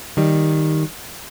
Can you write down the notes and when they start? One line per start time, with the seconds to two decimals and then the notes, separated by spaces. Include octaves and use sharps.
0.17 D#3 G3